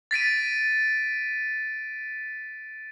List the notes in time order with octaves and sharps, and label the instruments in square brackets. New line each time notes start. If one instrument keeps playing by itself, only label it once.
[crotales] A6 B6 D7 D#7